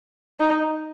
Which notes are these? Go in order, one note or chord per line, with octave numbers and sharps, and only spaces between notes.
D#4